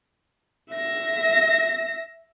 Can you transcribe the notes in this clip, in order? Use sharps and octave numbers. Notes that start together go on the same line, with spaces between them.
E5 A#6